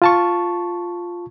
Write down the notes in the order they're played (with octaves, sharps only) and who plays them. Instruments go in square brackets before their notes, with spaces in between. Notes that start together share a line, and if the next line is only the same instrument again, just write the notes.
[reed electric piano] F4 A5 C#6